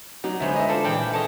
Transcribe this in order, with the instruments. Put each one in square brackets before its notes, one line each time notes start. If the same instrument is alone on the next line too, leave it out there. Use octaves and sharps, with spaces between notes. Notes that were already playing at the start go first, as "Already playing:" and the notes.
[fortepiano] F#3 [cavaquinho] D#4 D5
[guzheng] D3 G#3 B3 [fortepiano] C5 C#5 E5
[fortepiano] D#5 E5
[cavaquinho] F4 A4 C5 [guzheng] D5
[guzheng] A#2 E3 G#4 [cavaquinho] D5 G5 [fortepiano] E5
[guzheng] G#4 C5 [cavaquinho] A4 C#5 D#5